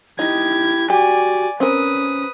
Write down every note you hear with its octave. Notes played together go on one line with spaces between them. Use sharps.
D#4 E4 G4 G#6
F#4 G4 D5 G#5
C4 C#4 A#4 B4 D#6